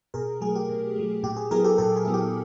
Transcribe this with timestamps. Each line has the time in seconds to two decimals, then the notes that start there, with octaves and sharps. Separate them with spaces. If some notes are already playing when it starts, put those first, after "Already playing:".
0.14 B2 G#4 A#4
0.41 F#3 A3 G#4
0.55 G4
0.69 B2
0.96 F#3 A3
1.23 A#2 G4
1.36 G#4
1.51 F#3 B3 E4 G#4 A#4
1.64 G4 A4
1.78 A#2 G4 A4
1.96 G#4
2.05 F#3 B3 E4
2.14 G4